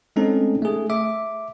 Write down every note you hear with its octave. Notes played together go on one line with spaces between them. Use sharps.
G#3 A3 C4 C#4 D#4 A4
A3 G#4
E5 D6